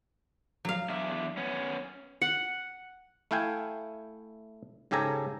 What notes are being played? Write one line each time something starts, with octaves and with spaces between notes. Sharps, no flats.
F#3 F5
E2 D4 E5
B3 C#4
F#5
A3 E4 F5 G5 G#5
G#2 C#3 G4 A4 G#5 A#5